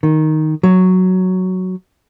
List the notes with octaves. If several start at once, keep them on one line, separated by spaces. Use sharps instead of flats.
D#3
F#3